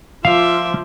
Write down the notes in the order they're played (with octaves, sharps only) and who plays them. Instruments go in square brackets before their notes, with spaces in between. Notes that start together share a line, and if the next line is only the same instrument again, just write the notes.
[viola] F3 F4 [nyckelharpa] E5 D6 [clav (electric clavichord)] F5